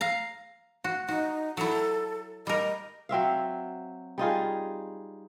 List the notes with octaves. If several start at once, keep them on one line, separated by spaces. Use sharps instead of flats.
F5 A#5
F#4
D#4 F#4
F#3 E4 A4
G3 A#4 D#5
F#3 C4 E5 F5
G3 D#4 F4 G#4